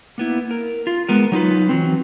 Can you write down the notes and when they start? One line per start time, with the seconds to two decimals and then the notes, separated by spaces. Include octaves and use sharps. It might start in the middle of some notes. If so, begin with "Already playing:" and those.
0.18 A#3 B3 E4
0.51 A#4
0.87 F4
1.08 G#3 B3 A#4
1.32 F#3 D#4 F4 B4
1.69 E3 F#3 C4